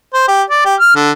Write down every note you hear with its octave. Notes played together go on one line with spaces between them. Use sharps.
C5
G4
D5
G4
F6
D3